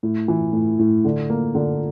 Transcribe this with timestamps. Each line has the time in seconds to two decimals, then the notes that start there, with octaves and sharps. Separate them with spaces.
0.03 A2
0.28 E3
0.53 A2
0.79 A2
1.05 D3
1.30 A#3
1.55 D3